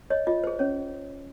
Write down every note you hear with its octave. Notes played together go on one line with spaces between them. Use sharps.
C#5 D#5
F4 D#5
G#4 C5
C#4 C#5